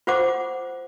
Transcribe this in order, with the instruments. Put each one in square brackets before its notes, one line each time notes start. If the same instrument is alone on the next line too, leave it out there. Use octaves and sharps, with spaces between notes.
[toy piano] F4 C5 F#5 D6